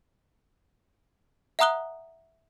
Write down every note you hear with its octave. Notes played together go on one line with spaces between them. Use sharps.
E5 F#5 A#5 D#6 F#6 G7